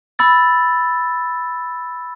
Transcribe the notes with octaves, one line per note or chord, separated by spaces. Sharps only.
B5 E6 A6